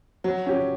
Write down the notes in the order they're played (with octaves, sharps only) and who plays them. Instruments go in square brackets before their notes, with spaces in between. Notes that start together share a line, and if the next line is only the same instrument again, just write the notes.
[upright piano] F#3
C#4 G4